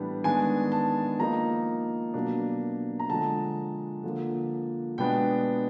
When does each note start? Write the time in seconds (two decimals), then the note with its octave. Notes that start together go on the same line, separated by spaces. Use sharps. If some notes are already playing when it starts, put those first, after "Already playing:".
Already playing: A2 E3 G3 B3 D4
0.24 D#3 G#3 B3 D4 G#5
0.72 A5
1.19 F3 A#3 D#4 A#5
2.14 B2 F#3 A#3 D4
3.00 A#5
3.09 D3 F3 G#3 A5
4.03 D3 F3 A#3
4.98 B2 G#3 B3 D4 G5